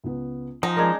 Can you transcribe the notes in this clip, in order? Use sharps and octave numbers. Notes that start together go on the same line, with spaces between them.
C#2 B3
F3 D#4 C5 F#5 G#5
G#3 C#4 D4 A#4 G#6